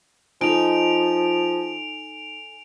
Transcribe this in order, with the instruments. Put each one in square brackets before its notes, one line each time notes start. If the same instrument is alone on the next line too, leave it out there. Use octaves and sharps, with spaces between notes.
[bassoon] F3 [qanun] D#4 [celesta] A4 G#5 [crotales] D7 F7